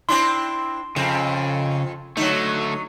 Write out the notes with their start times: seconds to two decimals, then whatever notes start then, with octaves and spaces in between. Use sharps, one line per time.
0.09 C4 D4 E4 C6
0.96 F2 C#3 C4
2.17 D3 F#3 A3 D#4